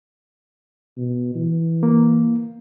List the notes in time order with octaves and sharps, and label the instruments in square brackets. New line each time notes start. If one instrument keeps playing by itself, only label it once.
[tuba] B2
E3
[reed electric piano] A#3